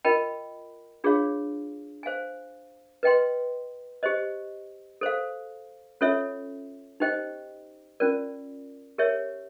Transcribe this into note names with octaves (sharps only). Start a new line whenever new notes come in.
F4 A#4 D#5 G5 B5
D4 F4 G#4 C#5 F5
C5 F5 G#5
B4 D#5 G5 C6
G4 C5 D#5
A4 C5 F5
C#4 F4 A4 C#5 E5
D#4 G4 C5 D#5 G5
C#4 F4 A#4 D5
G4 A#4 C#5 E5